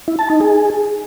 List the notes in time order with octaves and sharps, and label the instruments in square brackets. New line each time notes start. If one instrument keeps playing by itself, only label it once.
[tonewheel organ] E4
A5
D#4
G#4